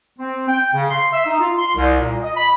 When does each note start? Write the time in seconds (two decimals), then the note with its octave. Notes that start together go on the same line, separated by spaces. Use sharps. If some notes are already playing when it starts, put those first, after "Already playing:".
0.19 C4
0.48 G5
0.74 C#3
0.90 C6
1.13 E5
1.26 D#4
1.40 F4
1.59 C6
1.76 C2
2.00 A#2
2.23 D#5
2.36 B5